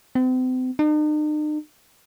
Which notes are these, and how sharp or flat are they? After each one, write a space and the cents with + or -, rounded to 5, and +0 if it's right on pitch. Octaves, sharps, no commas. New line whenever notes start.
C4 -40
D#4 -45